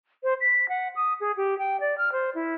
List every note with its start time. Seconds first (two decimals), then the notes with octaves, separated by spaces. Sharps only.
0.23 C5
0.40 B6
0.68 F#5
0.95 D#6
1.20 G#4
1.36 G4
1.58 G5
1.80 D5
1.97 F6
2.12 C5
2.34 E4